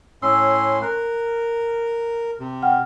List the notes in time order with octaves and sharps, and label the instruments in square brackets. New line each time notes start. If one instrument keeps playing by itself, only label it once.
[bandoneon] A2 C#4 C6 [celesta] E6
[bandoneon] A#4 [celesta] F#6
[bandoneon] C3
[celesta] F#5 G5 F6